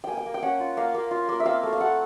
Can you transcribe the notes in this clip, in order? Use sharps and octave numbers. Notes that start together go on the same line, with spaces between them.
A#3 G5 G#5
G5
A#3
G5
C#4 F#5
F4
A#3 F5
A#3
F4
A#3
E5
C4 F5
A3
F5
A3 F#5